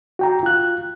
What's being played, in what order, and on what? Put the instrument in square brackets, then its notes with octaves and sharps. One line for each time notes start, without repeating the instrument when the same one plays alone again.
[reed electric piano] F#4 G5 A#5
F4 F#6